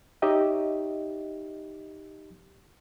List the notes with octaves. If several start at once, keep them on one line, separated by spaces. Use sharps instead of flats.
D#4 G4 C#5 D#5 E5